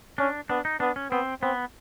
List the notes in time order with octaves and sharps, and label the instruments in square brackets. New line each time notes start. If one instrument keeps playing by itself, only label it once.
[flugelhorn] C#4 [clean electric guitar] D4
[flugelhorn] B3 [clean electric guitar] D4
[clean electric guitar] D#4
[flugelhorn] B3 [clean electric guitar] D4
[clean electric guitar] C#4
[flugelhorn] B3 [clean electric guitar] C4
[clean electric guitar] B3 [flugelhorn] C4